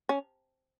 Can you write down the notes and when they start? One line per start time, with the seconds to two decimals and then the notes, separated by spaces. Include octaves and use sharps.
0.09 C#4